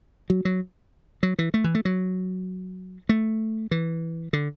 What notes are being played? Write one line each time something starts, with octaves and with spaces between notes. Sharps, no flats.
F#3
F#3
F#3
E3
A3
E3
A3
F#3
A3
E3
D3